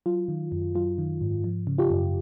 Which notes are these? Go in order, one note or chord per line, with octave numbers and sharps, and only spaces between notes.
F#3 F4
D#3
F#2
F#3 F4
D#3
G#2
F3
C#3
F4 G4
F#2